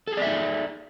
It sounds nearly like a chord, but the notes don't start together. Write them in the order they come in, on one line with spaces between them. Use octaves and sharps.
A4 G#4 D5 E5 D#4